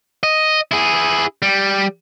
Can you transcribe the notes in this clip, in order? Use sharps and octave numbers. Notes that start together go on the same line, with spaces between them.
D#5
E4 G#4
G3